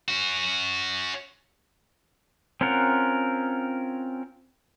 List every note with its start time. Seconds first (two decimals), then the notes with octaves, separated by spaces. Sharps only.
0.08 C#4 F#4
2.61 C4 C#4 F4 A#4 F#5